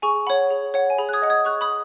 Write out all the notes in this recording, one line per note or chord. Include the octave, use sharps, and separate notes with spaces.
G#4 G#5 C#6
C#5 F#5 B5
G#4
C#5 F#5
G#5
G#4 B5
F#6
D#6 G#6
D#5 F#5
D#6 G#6
G#4 C#6 F#6
B5 D#6